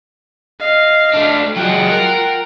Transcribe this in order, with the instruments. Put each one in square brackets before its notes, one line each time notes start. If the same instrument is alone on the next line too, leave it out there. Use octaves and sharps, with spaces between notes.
[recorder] D#5 [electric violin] F5
[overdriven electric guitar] A3 D4
[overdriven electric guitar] F#3 G#3 [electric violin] F4 F#5 [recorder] G5
[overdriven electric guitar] A#4